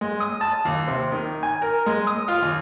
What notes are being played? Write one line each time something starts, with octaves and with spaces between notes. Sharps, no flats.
G#3
D#6
A5
D#2
C3
D#3
G#5
A#4
G#3
D#6
F4
D#2